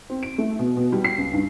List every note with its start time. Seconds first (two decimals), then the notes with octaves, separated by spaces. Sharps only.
0.10 C4
0.23 D7
0.38 A3
0.59 B2
0.77 B2
0.92 G3
1.04 C7
1.18 C#2
1.33 G2